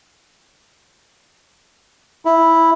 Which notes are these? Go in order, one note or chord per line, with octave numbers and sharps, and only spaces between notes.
E4